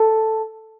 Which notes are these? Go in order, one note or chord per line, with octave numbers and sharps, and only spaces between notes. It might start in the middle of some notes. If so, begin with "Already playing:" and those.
Already playing: A4